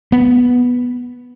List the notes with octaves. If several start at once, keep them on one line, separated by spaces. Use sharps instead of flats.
B3